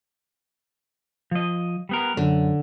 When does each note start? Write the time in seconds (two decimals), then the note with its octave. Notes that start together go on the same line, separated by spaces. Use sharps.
1.31 F3 D#5
1.89 G3 B3 A#4
2.17 F#2 D3